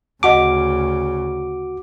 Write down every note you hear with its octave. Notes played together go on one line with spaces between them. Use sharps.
D2 C#3 F#4 D#5 F#5 A5 D6